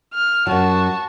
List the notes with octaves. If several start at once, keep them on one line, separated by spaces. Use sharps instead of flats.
F6
F#2 F#3 F#4 A5